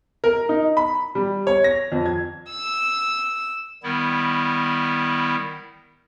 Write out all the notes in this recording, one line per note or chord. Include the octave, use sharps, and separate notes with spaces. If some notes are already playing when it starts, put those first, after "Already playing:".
A#4
D#4
B5
G3
C#5
A#6
F2
G#6
E6
D#3 G3 B3 E4